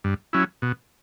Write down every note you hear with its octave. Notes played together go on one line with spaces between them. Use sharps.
G2
F#3 C#4 E4
B2